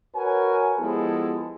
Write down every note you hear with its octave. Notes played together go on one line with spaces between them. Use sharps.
F#4 A#4 B4 C#5 G#5
F3 G#3 B3 E4 G4 A4